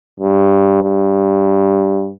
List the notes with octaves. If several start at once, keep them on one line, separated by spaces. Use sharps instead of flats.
G2
G2